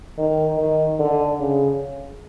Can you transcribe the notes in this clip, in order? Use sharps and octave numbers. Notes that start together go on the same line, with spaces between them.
D#3
D#3
D3
C#3